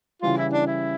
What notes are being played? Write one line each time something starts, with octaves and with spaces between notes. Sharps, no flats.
C#3 E3 G3 F4
E4
D4
E4